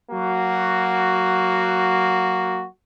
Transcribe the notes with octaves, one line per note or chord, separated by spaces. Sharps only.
F#3 A#3 F#4